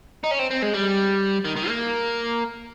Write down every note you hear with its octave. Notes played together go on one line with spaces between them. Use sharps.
D#4
C#4
C4
C4
G#3
G3
D#3
D#3
A#3